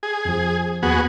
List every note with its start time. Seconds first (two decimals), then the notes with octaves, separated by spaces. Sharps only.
0.03 G#4
0.25 F2 F3
0.83 D#2 B3 F#4 G#4